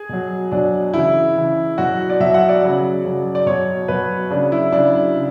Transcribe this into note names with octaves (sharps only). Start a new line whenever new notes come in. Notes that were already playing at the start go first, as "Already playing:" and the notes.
Already playing: G#4
B2 F#3
B2 F#3 D4
C#3 E3 E4
C#3 E3
B2 F#3 F#4
D5
B2 F#3 E5
F#5
D5
C#3 F#3
C#3 F#3
D5
B2 F#3 C#5
B2 F#3 B4
C#3 F#3 D4
E4
C#3 F#3 D4
C#3